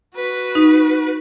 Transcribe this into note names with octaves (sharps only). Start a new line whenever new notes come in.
F#4 B4
D#4